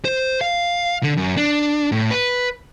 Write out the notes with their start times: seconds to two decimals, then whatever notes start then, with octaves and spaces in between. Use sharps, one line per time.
0.05 C5
0.41 F5
1.03 D3
1.17 F#2
1.37 D4
1.92 A2
2.11 B4